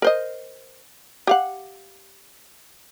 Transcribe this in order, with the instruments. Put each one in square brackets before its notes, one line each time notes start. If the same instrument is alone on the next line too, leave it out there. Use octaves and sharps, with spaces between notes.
[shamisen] A#4 C5 D#5
G4 F5 F#5